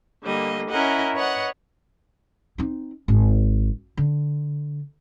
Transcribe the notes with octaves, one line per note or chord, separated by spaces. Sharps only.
D3 G3 A#3 D#5
C#4 E4 A#4 D#5 F#5
B4 C#5 D#5 F#5 F#6
C4 D#4
G#1
D3